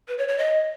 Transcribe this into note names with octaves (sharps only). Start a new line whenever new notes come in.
B4
C#5
C#5
D#5